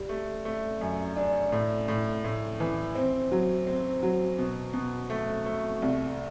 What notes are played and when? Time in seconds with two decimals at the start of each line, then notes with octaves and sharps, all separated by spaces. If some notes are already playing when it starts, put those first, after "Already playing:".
Already playing: G3
0.09 A3
0.45 A3
0.81 F#2
1.17 D4
1.52 A2
1.88 A2
2.24 A2
2.60 E3
2.95 C4
3.32 F#3
3.67 C4
4.03 F#3
4.38 B2
4.74 B2
5.10 A3
5.46 A3
5.82 C2